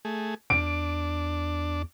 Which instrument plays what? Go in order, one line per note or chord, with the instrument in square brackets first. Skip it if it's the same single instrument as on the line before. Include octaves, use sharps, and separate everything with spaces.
[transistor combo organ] A3 G#4
[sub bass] E2 [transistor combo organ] D4 [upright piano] D7